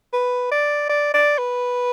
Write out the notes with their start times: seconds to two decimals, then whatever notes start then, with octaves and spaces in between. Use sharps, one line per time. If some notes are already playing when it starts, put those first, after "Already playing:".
0.13 B4
0.51 D5
0.89 D5
1.14 D5
1.38 B4